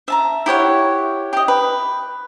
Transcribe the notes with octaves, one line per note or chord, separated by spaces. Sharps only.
E5 A5 A#5
E4 G4 C#5 F#5
G4 D#5
B4